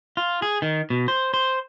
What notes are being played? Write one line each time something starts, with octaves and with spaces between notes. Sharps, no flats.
F4
G#4
D#3
B2
C5
C5